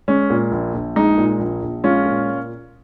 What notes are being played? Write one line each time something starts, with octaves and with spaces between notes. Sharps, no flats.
G#3 C#4
A#2
A#1
A#1
G#3 D#4
A#2
A#1
A#1
G#3 C#4 F4
A#2